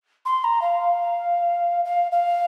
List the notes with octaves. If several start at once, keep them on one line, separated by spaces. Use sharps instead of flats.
C6
A#5
F5
F5
F5